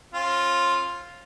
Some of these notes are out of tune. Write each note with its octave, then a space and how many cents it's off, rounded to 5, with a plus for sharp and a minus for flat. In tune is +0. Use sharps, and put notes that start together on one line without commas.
C#4 -45 F4 +0